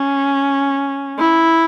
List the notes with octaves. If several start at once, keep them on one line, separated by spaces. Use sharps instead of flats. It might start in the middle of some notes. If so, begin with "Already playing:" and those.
Already playing: C#4
E4